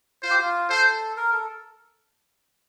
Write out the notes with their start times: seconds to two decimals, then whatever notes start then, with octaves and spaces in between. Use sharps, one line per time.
0.23 F4 C5
0.30 G4
0.38 F4
0.70 A4 C5
1.17 A#4
1.32 A4